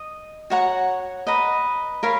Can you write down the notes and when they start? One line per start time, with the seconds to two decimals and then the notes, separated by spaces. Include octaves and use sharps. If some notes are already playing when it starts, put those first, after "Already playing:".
Already playing: D#5
0.50 F#4 C#5 F#5 A#5
1.27 B4 D#5 A#5
2.03 A#4 C#5 F5 B5